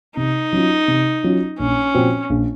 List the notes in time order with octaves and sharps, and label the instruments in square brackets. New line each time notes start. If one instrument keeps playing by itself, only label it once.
[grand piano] C3 [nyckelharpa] D#4
[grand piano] F#3 C#4 F4
C3
F#3 C#4 F4
[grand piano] A#1 [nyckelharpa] C#4
[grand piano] A#2 F3 C4 F#4
A#1